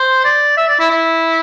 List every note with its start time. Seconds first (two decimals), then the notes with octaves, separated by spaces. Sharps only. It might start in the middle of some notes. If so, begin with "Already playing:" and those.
Already playing: C5
0.24 D5
0.57 E5
0.68 D5
0.80 E4
0.90 E4